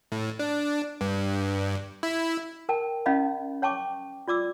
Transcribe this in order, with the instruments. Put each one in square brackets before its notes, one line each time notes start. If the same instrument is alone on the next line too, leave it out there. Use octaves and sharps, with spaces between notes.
[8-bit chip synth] A2
D4
G2
E4
[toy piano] A#4 G5 A5
C#4 E4 D#5 F5 B5
C#5 G5 A5 C#6 D6
F4 D5 D6 E6